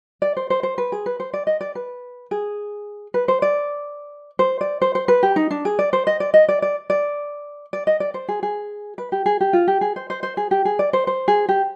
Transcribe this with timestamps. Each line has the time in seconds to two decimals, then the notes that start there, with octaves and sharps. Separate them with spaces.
0.22 D5
0.37 C5
0.50 C5
0.63 C5
0.78 B4
0.92 G#4
1.06 B4
1.20 C5
1.33 D5
1.47 D#5
1.61 D5
1.75 B4
2.31 G#4
3.14 B4
3.28 C5
3.42 D5
4.39 C5
4.61 D5
4.82 C5
4.95 C5
5.08 B4
5.23 G4
5.36 D#4
5.51 D4
5.65 G#4
5.79 D5
5.93 C5
6.07 D#5
6.20 D5
6.34 D#5
6.48 D5
6.62 D5
6.90 D5
7.73 D5
7.87 D#5
8.00 D5
8.14 C5
8.28 G#4
8.43 G#4
8.98 B4
9.12 G4
9.26 G#4
9.41 G4
9.53 F4
9.68 G4
9.81 G#4
9.96 C5
10.10 C5
10.23 C5
10.37 G#4
10.51 G4
10.65 G#4
10.79 D5
10.93 C5
11.07 C5
11.28 G#4
11.49 G4